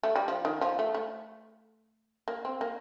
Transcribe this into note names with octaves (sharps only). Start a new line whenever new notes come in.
A3
G3
F3
D#3
F3
A3
A3
A#3
C4
A#3